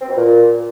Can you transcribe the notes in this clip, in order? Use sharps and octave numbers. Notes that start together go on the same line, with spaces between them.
C4
B2
A#2